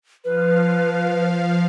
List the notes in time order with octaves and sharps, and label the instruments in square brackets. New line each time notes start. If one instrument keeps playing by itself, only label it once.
[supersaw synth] F3 F5 [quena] B4